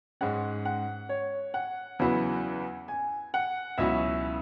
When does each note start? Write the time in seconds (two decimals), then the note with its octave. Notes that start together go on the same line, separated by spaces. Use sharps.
0.21 G#2 G#3 C#4 F#5
0.65 F#5
1.09 C#5
1.54 F#5
1.99 E2 C#3 F#3 B3 E4
2.88 G#5
3.34 F#5
3.78 C#2 B2 F#3 C#4 E4 E5